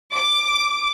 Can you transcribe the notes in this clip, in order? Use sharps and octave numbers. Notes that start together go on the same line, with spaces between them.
D6